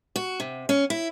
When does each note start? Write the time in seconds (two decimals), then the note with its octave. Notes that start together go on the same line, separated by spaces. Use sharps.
0.16 F#4
0.40 C3
0.69 C#4
0.90 E4